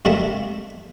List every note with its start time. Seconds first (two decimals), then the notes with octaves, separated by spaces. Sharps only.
0.05 G#2 C3 G3 A3 A#3 A5